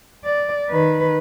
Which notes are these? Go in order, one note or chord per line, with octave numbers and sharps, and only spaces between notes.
D5
D#3 B4